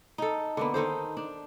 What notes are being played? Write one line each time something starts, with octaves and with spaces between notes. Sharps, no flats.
D#4 A4
D3 A#3 B3
D#3 D#4 A4 C5
D4